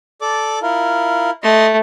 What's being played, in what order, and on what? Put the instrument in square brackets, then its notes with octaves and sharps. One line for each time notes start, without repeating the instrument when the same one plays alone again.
[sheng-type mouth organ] A4 D5 D6
E4 F4 A#4
[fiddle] A3 [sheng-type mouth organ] D#5 C6